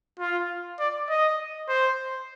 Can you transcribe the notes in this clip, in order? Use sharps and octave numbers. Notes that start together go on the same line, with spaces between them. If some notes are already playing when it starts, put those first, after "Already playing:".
F4
D5
D#5
C5